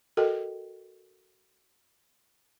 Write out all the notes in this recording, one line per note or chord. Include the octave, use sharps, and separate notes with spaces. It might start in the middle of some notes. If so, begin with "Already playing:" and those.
F#4 A4 A#4 D#5 G5